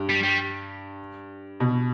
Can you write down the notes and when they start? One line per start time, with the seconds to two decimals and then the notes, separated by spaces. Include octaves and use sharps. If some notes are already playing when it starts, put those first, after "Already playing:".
Already playing: G2
0.10 G3
0.23 G3
1.60 B2